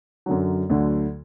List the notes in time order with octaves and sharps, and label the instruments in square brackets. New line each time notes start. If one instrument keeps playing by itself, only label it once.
[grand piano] F#2 D3 F#3
D2 D3 F#3